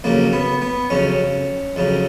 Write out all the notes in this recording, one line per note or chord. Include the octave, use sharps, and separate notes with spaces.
F2 C#3 F#3 A#3
B3
B3
F2 C#3 F#3 C#4
F2 C#3 F#3